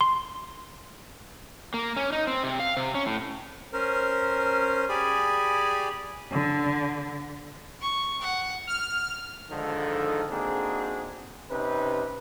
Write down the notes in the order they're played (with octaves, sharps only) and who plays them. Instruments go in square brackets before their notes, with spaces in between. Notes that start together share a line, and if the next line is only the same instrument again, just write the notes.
[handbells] C6
[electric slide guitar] A#3
C#4
D#4
C4
C3
F5
C3
C#4
A2
[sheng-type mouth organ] C#4 A#4 C5
G4 G#4 D5 G#5 B5
[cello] D3
[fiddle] C#6
F#5
[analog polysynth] F6
[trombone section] G#2 D3 D#3 F3 A4
A#3 C4 D4 D#4 F#4 G#4
C3 C#4 D#4 B4